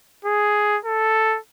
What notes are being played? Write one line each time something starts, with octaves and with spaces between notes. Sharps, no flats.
G#4
A4